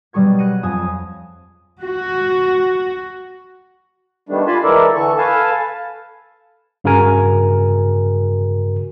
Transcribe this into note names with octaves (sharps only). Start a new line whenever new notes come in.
B2 F#3 G3 G#4 C#6 G#6
F#6 A#6 C#7 D#7
F2 G#5 D#6 E7
F#4
D#3 G3 A3 B3 D4
D4 F4 G#5 A5 B5 C6
E3 G#3 E4 A4 A#4 D5
D3 E3 A4 C#6
A4 B4 F5 G#5 A5
G2 C#3 F#4 G#4 A#4 G#5